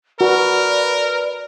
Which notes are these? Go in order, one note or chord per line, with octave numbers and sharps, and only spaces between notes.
F#4 A#4 B4 D5